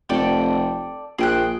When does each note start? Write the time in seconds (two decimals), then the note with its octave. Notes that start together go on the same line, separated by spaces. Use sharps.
0.09 F1 A4 D5 G5
1.18 A#1 G#4 G5 F#6